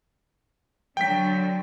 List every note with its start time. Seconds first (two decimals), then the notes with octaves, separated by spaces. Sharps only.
0.97 D3 F#3 G5 B6